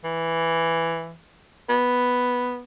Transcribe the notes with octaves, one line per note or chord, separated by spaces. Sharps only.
E3
B3